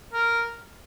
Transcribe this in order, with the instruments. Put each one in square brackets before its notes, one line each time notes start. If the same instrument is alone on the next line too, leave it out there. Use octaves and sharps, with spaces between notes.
[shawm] A#4